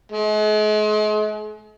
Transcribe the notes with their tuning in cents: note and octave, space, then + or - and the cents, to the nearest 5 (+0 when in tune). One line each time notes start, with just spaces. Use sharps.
G#3 +40